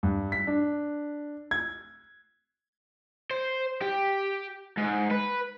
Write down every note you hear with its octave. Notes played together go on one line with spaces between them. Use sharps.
G2
B6
D4
G#6
C5
G4
G#2
B4